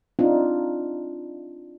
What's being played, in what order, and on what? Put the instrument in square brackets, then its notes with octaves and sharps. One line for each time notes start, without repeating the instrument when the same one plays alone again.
[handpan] C4 D4 D#4 F4